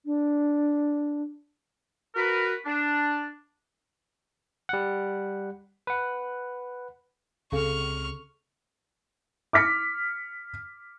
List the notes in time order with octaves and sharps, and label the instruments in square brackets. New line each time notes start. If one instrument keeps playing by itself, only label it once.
[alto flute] D4
[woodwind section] F#4 A#4 B4
D4
[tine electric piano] G3 F#5
B4 F#5
[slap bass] C#2 C4 [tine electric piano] C#3 [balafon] A4 F5 [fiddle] C#6 F6
[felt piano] D6 F6 B6 C#7